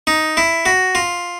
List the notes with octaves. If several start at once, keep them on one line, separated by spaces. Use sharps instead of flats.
D#4
E4
F#4
F4